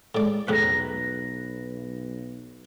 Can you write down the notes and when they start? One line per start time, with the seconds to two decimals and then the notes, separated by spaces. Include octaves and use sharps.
0.15 A2 G#3 D5
0.48 B1 E2 A2 C3 B4 A#5